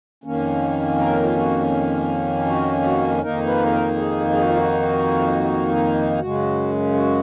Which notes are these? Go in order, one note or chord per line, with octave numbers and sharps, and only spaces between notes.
F2 D#3 A#3 C#4
A#4
F4
F#4
F#4
F#4
F2 D#3 A#3 D#4 A#4
B4
G#4
A#4
G#4
G#4
F#4
F4
F#4
F#2 C#3 G#3 F#4
F#4